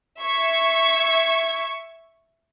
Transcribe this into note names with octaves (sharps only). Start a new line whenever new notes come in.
E5 C#6 G#6